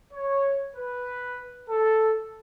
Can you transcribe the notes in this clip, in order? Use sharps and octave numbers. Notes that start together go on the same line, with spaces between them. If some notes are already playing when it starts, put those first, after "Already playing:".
C#5
B4
A4